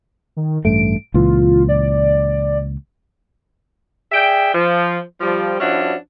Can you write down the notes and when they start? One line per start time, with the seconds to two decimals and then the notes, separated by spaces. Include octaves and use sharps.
0.37 D#3
0.65 A1 G2 A3 D7
1.14 C#2 A#2 E3 F4
1.69 D5
4.12 G#4 D5 E5 G5
4.54 F3
5.21 F3 G3
5.60 G2 F3 C#4 D4 E4 F#4